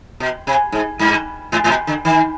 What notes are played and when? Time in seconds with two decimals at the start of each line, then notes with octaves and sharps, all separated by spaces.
0.20 B2
0.47 C3
0.72 G#2
0.99 G2
1.52 G#2
1.64 G#2
1.69 B2
1.87 D3
2.05 D#3